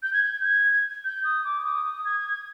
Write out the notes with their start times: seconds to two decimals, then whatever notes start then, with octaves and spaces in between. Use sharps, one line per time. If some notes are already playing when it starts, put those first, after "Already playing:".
0.03 G6
0.13 G#6
0.23 G6
0.44 G#6
1.05 G6
1.25 D#6
1.45 D6
1.65 D#6
2.05 G#6